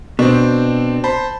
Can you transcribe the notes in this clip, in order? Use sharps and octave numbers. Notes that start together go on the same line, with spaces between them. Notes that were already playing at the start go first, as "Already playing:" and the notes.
B2 C4 D4
C5 A5 B5